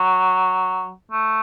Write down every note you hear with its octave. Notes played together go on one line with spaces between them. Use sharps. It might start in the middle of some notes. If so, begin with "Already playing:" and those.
Already playing: F#3
A3